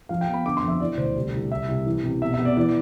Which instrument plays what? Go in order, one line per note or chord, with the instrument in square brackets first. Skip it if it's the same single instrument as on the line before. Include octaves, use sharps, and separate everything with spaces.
[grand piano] F3 F5
G5
B3
B5
D3 D6
C6
F2
E5
E3 D5
D2 C5
C2
C2
C2 E5
C2
E3
C3
B2 E5
B3 E5
D5
E3 D5